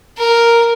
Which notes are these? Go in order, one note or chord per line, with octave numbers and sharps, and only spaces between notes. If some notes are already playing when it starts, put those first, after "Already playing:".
A#4